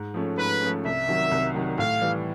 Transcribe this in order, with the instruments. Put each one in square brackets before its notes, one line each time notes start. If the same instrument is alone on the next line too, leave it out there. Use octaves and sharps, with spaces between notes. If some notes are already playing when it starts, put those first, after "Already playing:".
Already playing: [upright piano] G#2
F3 A3 C#4
[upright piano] G#2 [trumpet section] B4
[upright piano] F3 A3 C#4
[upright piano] C2 [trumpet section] E5
[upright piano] C3 D#3 F#3
C2
C3 D#3 F#3
[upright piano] A2 [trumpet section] F5
[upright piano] E3 G3